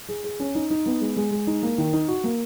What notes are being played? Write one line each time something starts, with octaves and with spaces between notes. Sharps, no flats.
G#4
G#4
C#4
D#4
D#4
B3
G#3
G#3
G#3
D#4
A#3
D#3
D#4
F#4
A#3